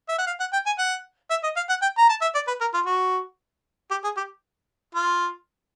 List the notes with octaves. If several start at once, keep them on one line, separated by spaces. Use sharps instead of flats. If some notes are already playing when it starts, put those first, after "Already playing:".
E5
F#5
F5
F#5
G5
G#5
F#5
E5
D#5
F5
F#5
G5
A#5
A5
E5
D5
B4
A#4
F4
F#4
G4
G#4
G4
F4